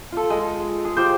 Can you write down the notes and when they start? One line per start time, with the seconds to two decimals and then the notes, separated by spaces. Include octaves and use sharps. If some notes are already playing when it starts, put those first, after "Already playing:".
0.12 F4 A4
0.30 G#3
0.85 G#4
0.97 F4 G4 C5